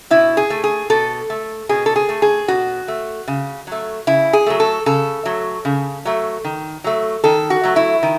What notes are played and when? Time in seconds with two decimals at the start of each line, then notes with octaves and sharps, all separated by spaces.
0.11 B2 E4
0.37 G#4
0.50 A3
0.64 G#4
0.90 B2 A4
1.30 A3
1.69 B2 G#4
1.86 A4
1.96 G#4
2.09 A3
2.22 G#4
2.48 B2 F#4
2.88 A3
3.28 C#3
3.67 F#3 A3
4.07 C#3 E4
4.33 G#4
4.46 F#3 A3
4.60 A4
4.86 C#3 A4
5.26 F#3 A3
5.65 C#3
6.05 F#3 A3
6.44 D#3
6.84 F#3 A3
7.24 D#3 A4
7.50 F#4
7.64 F#3 A3
7.76 E4
8.03 D#3